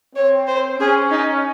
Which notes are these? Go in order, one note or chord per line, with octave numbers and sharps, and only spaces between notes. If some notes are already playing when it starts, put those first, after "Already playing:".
C4 C#5
C5
C#4 G#4
D#4